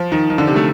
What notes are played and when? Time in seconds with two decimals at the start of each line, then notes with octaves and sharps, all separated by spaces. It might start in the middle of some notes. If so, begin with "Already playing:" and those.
Already playing: F3
0.12 D#3
0.30 D#3
0.38 D3
0.47 C3
0.56 A3